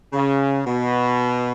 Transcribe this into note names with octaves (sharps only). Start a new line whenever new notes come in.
C#3
B2